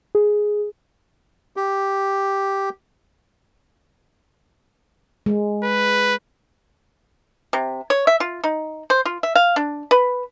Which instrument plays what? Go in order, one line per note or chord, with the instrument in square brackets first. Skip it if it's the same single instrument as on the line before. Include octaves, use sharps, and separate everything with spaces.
[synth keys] G#4
[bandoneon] G4
[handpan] G#3
[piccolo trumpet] B4
[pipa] C3
C#5
E5
F4
D#4
C5
F4
E5
F5
D4
B4